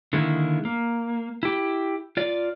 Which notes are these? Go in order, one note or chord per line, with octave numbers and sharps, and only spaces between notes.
D3 D#3 G#3 A#3 E4
A#3
E4 G4
F4 D5